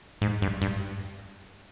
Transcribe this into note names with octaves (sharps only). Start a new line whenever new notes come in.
G#2
G2
G2